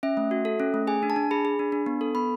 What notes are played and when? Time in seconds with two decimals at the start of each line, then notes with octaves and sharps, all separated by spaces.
0.03 C#4 E5
0.17 A3
0.31 F#4
0.45 A4
0.60 C#4
0.74 A3
0.87 G#4 G#5
1.03 D4
1.10 A5
1.16 D4
1.31 G#4 B5
1.45 G#4
1.59 D4
1.72 D4
1.86 B3
2.01 A4
2.15 B3 B5